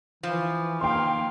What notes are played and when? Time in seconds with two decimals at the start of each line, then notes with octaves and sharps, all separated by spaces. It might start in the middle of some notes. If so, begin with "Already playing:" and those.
0.23 E3 F3
0.81 D#3 A#3 F5 G5 C6